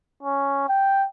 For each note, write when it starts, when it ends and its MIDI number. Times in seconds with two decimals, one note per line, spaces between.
0.23 0.64 61
0.69 1.07 79